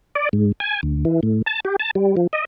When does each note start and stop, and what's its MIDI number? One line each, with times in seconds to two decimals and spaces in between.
0.15 0.29 74
0.33 0.52 44
0.60 0.81 80
0.83 1.05 38
1.05 1.20 52
1.23 1.42 45
1.46 1.60 81
1.65 1.76 67
1.80 1.91 81
1.95 2.16 55
2.17 2.27 53
2.33 2.45 75